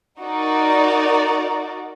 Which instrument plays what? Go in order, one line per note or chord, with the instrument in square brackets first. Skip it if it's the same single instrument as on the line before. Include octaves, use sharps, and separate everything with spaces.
[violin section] D#4 F#4 A#4 D5